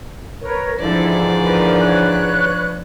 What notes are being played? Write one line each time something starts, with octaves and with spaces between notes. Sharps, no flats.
A#4 B4 C#5
G#2 D3 E3 F3 D4 E4 A4 D5
A#4 B4
B4 C#5 F#6